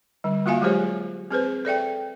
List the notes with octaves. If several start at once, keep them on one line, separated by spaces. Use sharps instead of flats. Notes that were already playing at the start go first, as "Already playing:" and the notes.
D3 G3
A#3 F4 F#4 E5 F5 G#5
F#3 G#3 G4 G#4 C5 C#5
C4 G#4 B4 C5
A4 D5 E5 G5